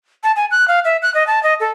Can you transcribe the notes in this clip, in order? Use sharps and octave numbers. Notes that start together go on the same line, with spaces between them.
A5
G#5
F#6
F5
E5
F#6
D#5
A5
D#5
A4